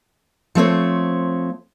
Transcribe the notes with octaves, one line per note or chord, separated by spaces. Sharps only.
F3 A3 C4 C#5